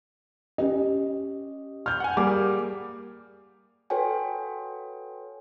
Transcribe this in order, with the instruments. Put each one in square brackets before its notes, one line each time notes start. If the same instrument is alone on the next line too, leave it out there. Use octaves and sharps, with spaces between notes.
[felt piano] C#4 G4 D#5
F6 G6
[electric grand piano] F#5 G#5
[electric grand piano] G3 A#3 G#4 [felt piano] D6
[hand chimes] F#4 A4 B4 C#5 G5 G#5